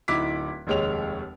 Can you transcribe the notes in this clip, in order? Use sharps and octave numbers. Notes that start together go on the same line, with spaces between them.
D1 D#4 E4 D6 B6
F1 D#2 G#3 C#5 F7